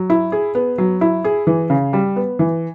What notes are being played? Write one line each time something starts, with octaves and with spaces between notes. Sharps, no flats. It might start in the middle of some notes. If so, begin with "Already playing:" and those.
Already playing: F#3
E4
G#4
B3
F#3
E4
G#4
E3
C#3
G3
B3
E3